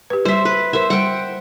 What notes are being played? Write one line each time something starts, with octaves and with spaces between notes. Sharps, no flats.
G4 B4
G3 C5 E5
B4
A#4 C5 E5
G3 F#5 G5